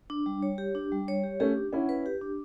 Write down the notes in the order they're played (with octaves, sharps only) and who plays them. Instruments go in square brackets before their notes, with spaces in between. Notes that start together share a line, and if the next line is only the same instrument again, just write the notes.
[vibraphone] D4
G3
C#5
G4
D4
G3
C#5
G4
[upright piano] A3 C#4 [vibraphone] G4
[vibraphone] D4
[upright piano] C#4 E4 [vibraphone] F#5
[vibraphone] B4
G4
D4